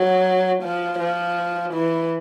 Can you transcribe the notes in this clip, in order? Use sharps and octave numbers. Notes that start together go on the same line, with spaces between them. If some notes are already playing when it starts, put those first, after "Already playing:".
Already playing: F#3
F3
F3
E3